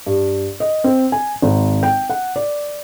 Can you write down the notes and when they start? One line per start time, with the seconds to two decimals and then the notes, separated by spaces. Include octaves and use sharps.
0.07 G2
0.60 D#5
0.84 C4
1.12 G#5
1.42 G#1
1.83 G5
2.10 F#5
2.36 D5